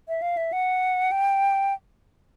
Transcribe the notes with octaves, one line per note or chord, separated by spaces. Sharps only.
E5
F5
E5
F#5
G5